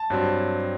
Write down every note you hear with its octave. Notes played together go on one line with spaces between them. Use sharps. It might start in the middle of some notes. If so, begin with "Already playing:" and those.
Already playing: A5
G2 F#3 C4